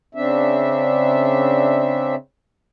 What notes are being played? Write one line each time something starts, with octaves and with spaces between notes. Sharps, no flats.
C#3 C4 D4 E5